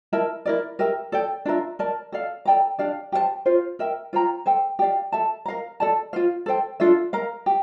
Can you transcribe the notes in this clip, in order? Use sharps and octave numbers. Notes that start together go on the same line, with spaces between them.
E4 A#4 E5 A5
E4 A#4 D5
G4 A#4 E5
A4 D5 G5
D4 F4 A#4 E5
A#4 D5 A5
A4 D5 F5
A4 D5 G5 A#5
D4 G4 D5 F5
G4 C5 F5 A5
F4 C5 F5
A#4 E5 G5
F4 C5 G5 A#5
A4 C5 G5
G4 D5 F5
A4 E5 A5
A#4 F5 A#5
A4 D5 A5
F4 C5 F5
A4 C5 G5
D4 F4 A4 E5
A#4 F5 A#5
G4